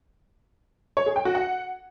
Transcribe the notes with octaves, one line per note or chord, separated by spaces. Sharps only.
C#5
G#4
G5
F#4
F#5